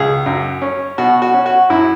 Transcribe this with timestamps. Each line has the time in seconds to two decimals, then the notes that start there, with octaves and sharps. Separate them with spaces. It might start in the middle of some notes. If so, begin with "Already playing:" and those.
Already playing: C#2 G#4
0.26 F#2
0.62 C#4
0.98 B2 F#4
1.22 F#4
1.34 C#4
1.46 F#4
1.70 F#2 E4